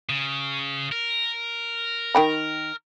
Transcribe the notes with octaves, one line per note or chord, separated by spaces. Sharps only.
C#3
A#4
D#3 G5 B5